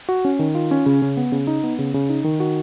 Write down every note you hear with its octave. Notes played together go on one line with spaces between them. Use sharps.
F#4
C#4
D#3
F4
C#4
C#3
C#3
B3
C#3
D#4
B3
C#3
C#3
D#4
D#3
F#4